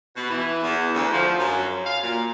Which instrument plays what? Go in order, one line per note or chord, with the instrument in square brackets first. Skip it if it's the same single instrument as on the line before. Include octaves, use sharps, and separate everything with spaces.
[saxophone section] B2
E3
E2
D2
F3
F#2
F5
A#2